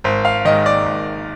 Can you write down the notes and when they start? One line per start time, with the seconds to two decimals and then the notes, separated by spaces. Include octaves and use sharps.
0.04 G#1 C5
0.25 F5
0.45 G#2 D#3 D#5
0.66 D5
0.86 G#1